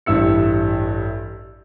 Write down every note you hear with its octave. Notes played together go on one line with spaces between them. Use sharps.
A1 G2 E4 E6 C#7